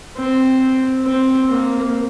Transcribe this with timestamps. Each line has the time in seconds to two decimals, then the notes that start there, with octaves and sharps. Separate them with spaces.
0.17 C4
1.05 C4
1.49 A#3